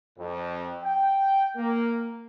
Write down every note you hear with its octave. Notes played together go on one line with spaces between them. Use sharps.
F2
G5
A#3